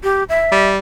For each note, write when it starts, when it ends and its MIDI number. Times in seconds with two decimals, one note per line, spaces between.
0.03 0.23 67
0.29 0.66 76
0.52 0.78 55